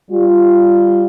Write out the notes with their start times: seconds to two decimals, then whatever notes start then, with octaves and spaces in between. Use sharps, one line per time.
0.11 G3 F4